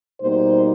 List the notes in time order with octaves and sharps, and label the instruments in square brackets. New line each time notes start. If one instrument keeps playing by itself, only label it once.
[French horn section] B2 G3 A#3 D#4 C5